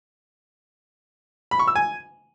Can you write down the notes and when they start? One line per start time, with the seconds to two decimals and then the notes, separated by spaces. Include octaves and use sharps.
1.51 B5
1.59 C#6
1.67 E6
1.76 G#5